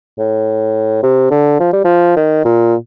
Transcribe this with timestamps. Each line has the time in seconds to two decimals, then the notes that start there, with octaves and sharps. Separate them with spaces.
0.18 A2
1.03 C3
1.31 D3
1.60 F3
1.73 G3
1.85 F3
2.16 D#3
2.45 A#2